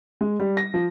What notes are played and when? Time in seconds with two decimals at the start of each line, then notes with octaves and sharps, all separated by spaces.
0.21 G#3
0.40 G3
0.57 A#6
0.74 F3